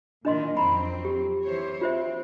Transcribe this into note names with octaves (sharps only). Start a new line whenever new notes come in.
A#2 D#3 E3 D4 D#5 C6
F2 F#3 C4 A#5 B5
G4
E3 C5 C#5
C4 F4 C5 E5